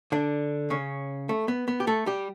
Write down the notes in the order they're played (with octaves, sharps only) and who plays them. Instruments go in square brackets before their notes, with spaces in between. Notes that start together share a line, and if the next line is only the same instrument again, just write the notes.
[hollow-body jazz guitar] D3 D4
C#3 C#4
A3
B3
B3
G4
A3 A4
G3 G4